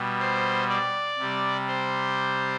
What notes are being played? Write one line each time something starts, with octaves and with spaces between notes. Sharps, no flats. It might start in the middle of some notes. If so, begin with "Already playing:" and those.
Already playing: B2 G3
C5
D5
C3 G3
C5